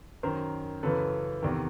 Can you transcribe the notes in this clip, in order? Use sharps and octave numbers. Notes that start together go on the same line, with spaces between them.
F#2 D#3 A#4 C5
F#2 C#3 E3 A4 B4
E2 C3 D#3